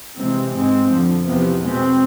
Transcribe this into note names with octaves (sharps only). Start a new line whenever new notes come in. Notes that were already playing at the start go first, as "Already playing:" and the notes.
C3 E3 G#3 C4
G#2 G#3 C4
F2 D3 F3
E2 C3 F3 B3
B2 G#3 C4